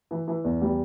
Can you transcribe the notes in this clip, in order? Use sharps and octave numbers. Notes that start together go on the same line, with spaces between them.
E3
E3
E2
G3